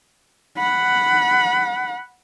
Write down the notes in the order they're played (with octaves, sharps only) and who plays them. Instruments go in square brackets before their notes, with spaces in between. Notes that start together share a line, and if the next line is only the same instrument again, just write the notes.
[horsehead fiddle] F#5 B5